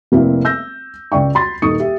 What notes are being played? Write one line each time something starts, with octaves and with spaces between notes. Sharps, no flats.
F1 A#3 C4 E4
E6 G6 A#6
C#2 D5 G5 C#6
B5 C6 A6
D#1 D#4 A4 C#6 D#6 C#7
G4 E5